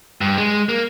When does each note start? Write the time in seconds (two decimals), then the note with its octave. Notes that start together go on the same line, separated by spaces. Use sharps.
0.21 G2
0.38 G#3
0.69 A#3